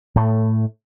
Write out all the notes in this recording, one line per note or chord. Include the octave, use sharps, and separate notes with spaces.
A2 A3